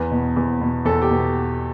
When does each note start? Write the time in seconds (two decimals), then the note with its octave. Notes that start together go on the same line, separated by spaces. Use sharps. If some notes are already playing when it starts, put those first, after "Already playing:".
Already playing: E2 B4
0.11 B2
0.36 E2
0.61 B2
0.85 E2 A4
1.02 G4
1.11 B2